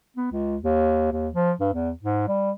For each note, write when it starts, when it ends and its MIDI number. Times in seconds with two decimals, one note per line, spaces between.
0.17 0.27 59
0.32 0.57 37
0.62 1.08 39
1.12 1.29 39
1.34 1.52 53
1.60 1.70 43
1.73 1.91 40
2.02 2.26 44
2.28 2.51 55